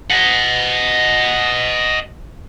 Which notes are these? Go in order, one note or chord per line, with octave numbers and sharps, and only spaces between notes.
D#5 F#5